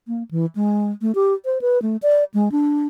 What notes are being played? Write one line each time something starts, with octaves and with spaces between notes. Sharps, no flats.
A#3
E3
G#3
A3
G4
C5
B4
A3
D5
G#3
D4